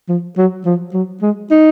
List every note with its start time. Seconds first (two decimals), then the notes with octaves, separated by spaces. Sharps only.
0.09 F3
0.37 F#3
0.66 F3
0.94 F#3
1.22 G#3
1.51 D#4